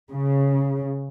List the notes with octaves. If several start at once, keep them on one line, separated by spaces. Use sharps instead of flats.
C#3